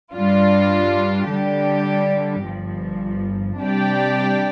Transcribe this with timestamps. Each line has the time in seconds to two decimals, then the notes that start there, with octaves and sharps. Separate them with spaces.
0.14 G2 G3 D4 F4
1.28 D3 G3 D4 G4
2.43 G1 G2 F3
3.58 C3 G3 D4 G4 D5